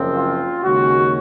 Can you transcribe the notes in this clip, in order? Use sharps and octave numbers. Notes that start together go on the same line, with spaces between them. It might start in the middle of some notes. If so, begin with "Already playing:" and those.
Already playing: F#1 F#2 F3 C4
F4
D#2 C#3 G#3 C#4 F#4